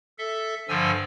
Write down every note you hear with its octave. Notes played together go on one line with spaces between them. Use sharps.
A4 E5
G2 D3 F3 G#5 E6